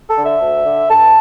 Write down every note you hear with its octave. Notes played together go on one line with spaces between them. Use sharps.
A4
D3
E5
D2
D3
G2 A5